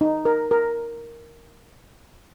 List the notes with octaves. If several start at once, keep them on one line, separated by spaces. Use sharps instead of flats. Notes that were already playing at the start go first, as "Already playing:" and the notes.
D#4
A#4
A#4